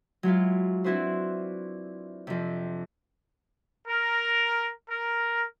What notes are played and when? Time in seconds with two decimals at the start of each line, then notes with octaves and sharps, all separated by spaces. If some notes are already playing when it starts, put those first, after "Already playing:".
0.23 F#3 G#3 E4 F4
0.84 C4 D4 E4 F#4 B4 C5
2.27 F2 C3
3.87 A#4
4.89 A#4